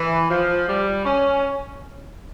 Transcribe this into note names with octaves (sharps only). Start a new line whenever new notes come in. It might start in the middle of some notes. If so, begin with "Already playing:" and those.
Already playing: E3
F3
G3
C#4